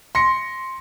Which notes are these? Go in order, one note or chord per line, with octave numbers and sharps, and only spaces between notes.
C6 A#6 C#7